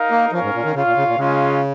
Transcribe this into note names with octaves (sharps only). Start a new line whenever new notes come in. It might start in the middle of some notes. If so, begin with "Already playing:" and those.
Already playing: D#4 A#4 F5
A#3
F3 C#4 A#4 C#5 F5
G#2
A#2
D#3
C#3 F4 C#5 F5
A#2
C#3
A#2
C#3 G#3 C#4 F4